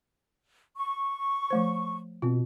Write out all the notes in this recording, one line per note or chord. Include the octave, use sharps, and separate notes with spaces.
C#6
F3 A3 C5
B2 C4 F4